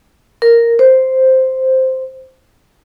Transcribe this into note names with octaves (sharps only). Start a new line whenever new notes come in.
A#4
C5